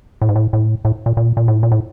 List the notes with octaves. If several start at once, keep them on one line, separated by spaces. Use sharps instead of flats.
A2
G#2
A2
A2
A2
A#2
A#2
A#2
A2
A#2
A2